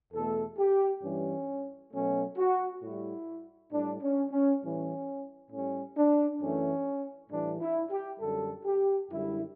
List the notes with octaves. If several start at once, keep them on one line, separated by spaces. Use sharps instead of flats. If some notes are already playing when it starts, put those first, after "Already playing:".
E2 B2 A3 A4
G4
G2 E3 G3 C#4
B2 F#3 A3 C#4
F#4
A2 G3 E4
A2 G3 D4
C#4
C#4
A2 E3 G3 C#4
A2 G3 C#4
D4
F#2 E3 A3 C#4
A2 E3 G3 D4
E4
G4
F#2 D3 G3 A4
G4
F#2 D3 G3 E4